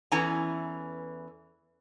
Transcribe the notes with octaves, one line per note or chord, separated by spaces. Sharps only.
E2 E3 C#4 A4 G#5 A#5